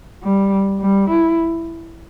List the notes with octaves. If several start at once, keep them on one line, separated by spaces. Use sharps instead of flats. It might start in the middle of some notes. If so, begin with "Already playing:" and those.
G3
G3
E4